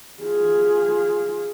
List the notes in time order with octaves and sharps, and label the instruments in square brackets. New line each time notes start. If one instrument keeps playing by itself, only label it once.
[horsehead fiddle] F4 G#4